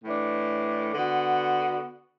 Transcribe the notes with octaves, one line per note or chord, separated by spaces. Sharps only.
A2 E3 D4
D3 B3 F#4